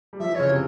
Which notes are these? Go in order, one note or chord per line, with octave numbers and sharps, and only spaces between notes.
G3
F3 E5
E3
C#3 C#5
C3